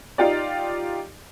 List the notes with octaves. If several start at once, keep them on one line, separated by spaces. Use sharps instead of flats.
D#4 F4 G4 D5